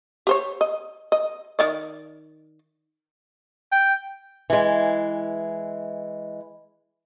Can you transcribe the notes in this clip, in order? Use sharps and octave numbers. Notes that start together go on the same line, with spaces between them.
G4 C5 C#5
D#5
D#5
D#3 D5 D#5
G5
E3 G#3